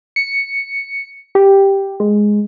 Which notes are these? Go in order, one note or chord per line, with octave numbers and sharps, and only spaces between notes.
C#7
G4
G#3